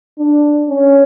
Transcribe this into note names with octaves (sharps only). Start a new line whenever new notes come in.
D4
C#4